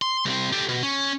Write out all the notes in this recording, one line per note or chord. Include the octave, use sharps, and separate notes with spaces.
C6
C2 C4
G4 A4
B2
C#4